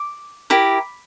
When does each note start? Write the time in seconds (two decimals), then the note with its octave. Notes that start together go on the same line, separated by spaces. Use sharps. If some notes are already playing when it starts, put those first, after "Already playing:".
Already playing: D6
0.50 E4 G4 A#4